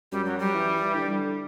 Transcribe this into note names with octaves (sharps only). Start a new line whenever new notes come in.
F#2 G3
F#3
G3
E3
E3
D3